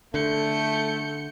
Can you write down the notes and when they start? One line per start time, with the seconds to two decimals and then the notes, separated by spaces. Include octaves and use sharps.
0.14 D3 A3 G6 C#7